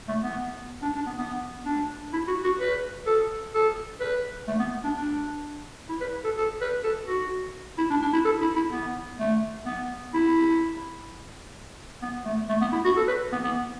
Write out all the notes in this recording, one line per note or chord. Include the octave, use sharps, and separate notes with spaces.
A3
B3
D4
D4
B3
B3
D4
E4
F#4
F#4
B4
A4
A4
B4
A3
B3
D4
D4
E4
B4
A4
A4
B4
A4
F#4
E4
D4
D4
E4
A4
E4
E4
B3
A3
B3
E4
B3
A3
A3
B3
E4
F#4
A4
B4
B3
B3